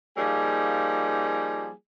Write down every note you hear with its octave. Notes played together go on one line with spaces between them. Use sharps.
F3 G3 A#3 D#4 G#4